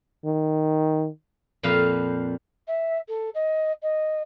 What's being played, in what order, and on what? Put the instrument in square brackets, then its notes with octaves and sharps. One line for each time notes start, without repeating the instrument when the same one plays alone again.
[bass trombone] D#3
[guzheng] F2 A#2 F3 B4 F5
[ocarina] E5
A4
D#5
D#5